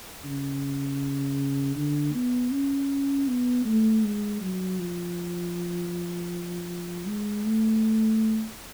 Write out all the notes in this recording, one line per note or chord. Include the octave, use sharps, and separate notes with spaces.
C#3
D3
B3
C#4
B3
A3
G#3
F#3
F3
G#3
A3